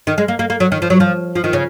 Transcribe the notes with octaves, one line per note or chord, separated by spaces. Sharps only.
D#3
G#3
A#3
A#3
A#3
F#3
D#3
F3
F#3
F3
F3
D#3
C#3